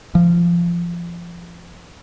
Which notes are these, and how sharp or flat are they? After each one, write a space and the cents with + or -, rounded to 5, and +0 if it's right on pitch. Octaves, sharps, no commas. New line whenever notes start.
F3 -20